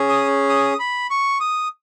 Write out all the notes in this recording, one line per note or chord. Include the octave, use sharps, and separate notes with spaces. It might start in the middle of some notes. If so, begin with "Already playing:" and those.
Already playing: C#4 G#4
D#6
D#6
B5
C#6
D#6